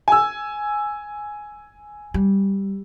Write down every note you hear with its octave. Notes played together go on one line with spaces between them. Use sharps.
G#5 E6
G3